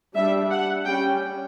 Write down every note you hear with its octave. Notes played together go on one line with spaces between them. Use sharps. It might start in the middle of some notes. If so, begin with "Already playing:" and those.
G3 D4 E5
F#5
G3 C#4 G5